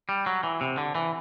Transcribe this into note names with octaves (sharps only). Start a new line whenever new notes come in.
G3
F#3
E3
C3
D3
E3